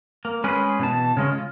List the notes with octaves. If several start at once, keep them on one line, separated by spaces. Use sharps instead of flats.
A#3
G#3 C#4 G#4 B4
B2 E3 A5
C#3 G#3 C#4
F4